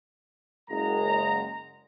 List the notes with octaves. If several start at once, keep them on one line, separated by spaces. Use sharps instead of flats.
F#1 G#3 A#5